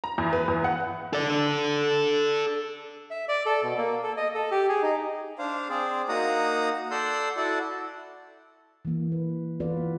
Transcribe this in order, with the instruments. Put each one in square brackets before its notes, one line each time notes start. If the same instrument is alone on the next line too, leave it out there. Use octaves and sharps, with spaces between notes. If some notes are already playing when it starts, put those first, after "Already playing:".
[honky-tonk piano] A#5
E2
B4
E2
F#5
[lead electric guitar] A4 D5
[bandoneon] E5
D5
A4
B2
A#3
A4
D#5
A4
G4
G#4
D#4
[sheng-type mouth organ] D4 C5 F5
C4 G#4 C5 D5
A#3 D#4 F#4 F#5 A#5 D#6
A4 D5 F#5 C6 E6 G6
E4 F#4 A4 D5 F#5 A5
[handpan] E3 A#3
B4
E3 B3 F4 A4 B4 D5